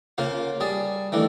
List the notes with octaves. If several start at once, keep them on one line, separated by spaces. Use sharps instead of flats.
C#3 A#3 F4 C5
G3 G#4 A5
D#3 E3 A3 D4